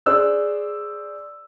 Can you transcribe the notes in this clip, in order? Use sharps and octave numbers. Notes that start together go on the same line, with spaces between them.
G#4 C5 D5 E6 F#6